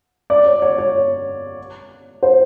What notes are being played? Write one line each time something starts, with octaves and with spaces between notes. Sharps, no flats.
D5
C#5
C#5
C#5
C5